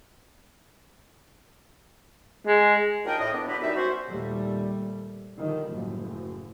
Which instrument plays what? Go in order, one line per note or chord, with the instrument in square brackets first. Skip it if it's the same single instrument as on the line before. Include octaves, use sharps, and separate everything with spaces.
[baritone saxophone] G#3
[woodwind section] D#2 A#2 D4 A#4 D#5 G5
A2 D#5
B3 D4
D3 F#3 B3 E4 G4 B4
F#2 G3 D#4 E5
F#3 C#4 F#4 C5
[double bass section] D#2 A#2 G3 A3
D3 D#3 F3 G3
F#1 A2